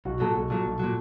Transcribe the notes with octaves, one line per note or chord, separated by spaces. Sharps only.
B1 F#4
A#2 F#3 A4
B1 A4
A#2 F#3 A4
B1
A#2 F#3